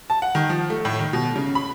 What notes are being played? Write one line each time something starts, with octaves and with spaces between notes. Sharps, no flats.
A5
F#5
D#3
F3
A3
A2
D#3
B2
C#3
B5